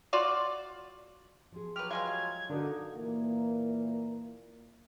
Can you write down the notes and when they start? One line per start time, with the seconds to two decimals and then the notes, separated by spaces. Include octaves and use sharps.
0.13 F4 F#4 D5
1.52 F3 G#4
1.76 F#3 G4 B4 F6
1.91 G3 G#3 F4 G#6
2.50 D3 D#4 F#4 A#4
2.96 A#2 E3 A#3